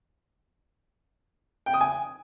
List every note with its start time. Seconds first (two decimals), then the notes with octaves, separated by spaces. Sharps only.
1.66 G5
1.74 D#6
1.81 G#5